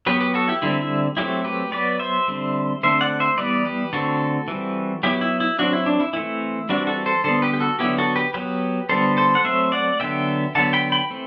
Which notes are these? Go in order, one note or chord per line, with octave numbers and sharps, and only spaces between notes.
F#3 B3 G4 B4
G4 B4
F#4 A4
E4 G4
D3 G3 C4 E4
E4
F#3 A3 C4 E4 G4
G4 B4
F#3 B3 B4 D5
C5 E5
D3 G3 C4
D3 A3 C4 C5 E5
D5 F#5
C5 E5
E3 G3 B3 B4 D5
G4 B4
D3 A3 C4 F#4 A4
E3 G3 C4
F#3 B3 E4 G4
E4
E4
F#3 C4 D4 F#4
E4
D4
E4
E3 A3 C4 E4
E3 G3 C4 D4 F#4
F#4 A4
A4 C5
D3 G3 B3 A4 C5
G4 B4
G4
F#4 A4
D3 F#3 B3 E4 G4
F#4 A4
G4 B4
F#3 B3 G4 B4
D3 G3 B3 A4 C5
A4 C5
F#5
F#3 A3 C4 C5 E5
D5 F#5
D3 F#3 B3 E5 G5
D3 F#3 B3 F#5 A5
G5 B5
G5 B5
E3 A3 C4